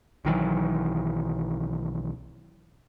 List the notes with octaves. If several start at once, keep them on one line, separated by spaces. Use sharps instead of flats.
B1 D#3 E3 F#3